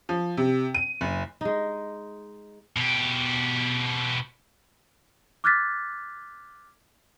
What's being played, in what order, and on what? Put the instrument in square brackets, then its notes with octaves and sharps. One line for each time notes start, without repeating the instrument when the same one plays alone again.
[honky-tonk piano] F3
C3
D#7
F#1
[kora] G#3 D#4
[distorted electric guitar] B2 G4
[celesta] D6 F6 F#6 G#6 A6 B6